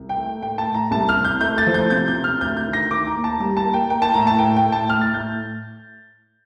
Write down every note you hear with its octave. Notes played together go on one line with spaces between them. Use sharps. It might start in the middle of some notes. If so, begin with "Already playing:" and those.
Already playing: C2
G5
A3
A2 G5
A5
A2
A#5
C2 A5
F6
C3
G6
A3 G6
A6
F3
G6
C3 G6
G6
C3
F6
D2 G6
G6
D#3
A#6
D#3 D6
A#5
D#2
A5
G3 A#5
A5
A#3
G5
A#3 G5
A5
A2 A#5
A5
A2 G5
G5
A2
A5
A2 F6
A6
A2 G6